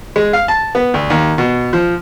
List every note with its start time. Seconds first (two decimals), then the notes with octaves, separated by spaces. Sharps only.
0.16 G#3
0.33 F5
0.48 A5
0.75 B3
0.94 D2
1.10 D#2
1.38 B2
1.73 F3